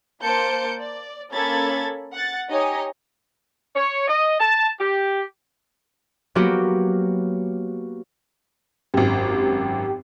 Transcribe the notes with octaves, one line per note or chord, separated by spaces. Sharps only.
A#3 C5 A5 G6 C#7 D7
D5
A#3 C#4 A4 B5 G#6 A6
F#5 A6
D#4 G4 C#5 D#5 G#5
C#5
D#5
A5
G4
F#3 A#3 B3 F#4 G4
G#1 F#2 G4